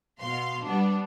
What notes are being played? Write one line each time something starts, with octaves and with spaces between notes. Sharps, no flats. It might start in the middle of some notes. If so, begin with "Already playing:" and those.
B2 F5 C6
G3 B3 D4